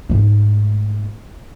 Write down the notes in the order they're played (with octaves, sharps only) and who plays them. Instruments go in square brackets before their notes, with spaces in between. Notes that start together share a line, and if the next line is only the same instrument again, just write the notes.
[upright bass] G#2 A3